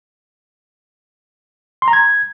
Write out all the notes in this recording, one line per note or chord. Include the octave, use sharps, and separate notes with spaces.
C6
A#5
G#6